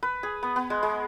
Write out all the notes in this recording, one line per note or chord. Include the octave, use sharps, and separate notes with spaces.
B4
G#4
B3
B3
G#3
G#3